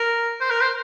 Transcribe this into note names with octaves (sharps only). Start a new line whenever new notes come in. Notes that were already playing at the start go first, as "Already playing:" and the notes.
Already playing: A#4
C5
A#4
C5